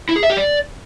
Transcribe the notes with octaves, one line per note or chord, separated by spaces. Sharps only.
E4
G#4
E5
G4
D5